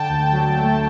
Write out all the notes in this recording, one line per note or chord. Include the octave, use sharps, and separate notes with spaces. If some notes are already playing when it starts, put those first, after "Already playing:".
Already playing: D3 G5 A5
D2
F#3
A3